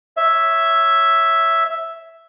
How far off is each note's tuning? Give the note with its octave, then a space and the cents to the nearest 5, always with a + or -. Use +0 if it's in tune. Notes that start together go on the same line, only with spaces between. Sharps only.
C#5 +0 E5 +0